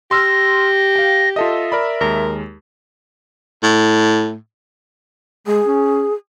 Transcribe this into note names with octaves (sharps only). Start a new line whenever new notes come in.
G4 C6 E6 F6 A#6
F5 G5
F4 A4 D#5 E5
A#4 D5 B5
D#2 G#3 A#4
A2
G#3 G#4
C#4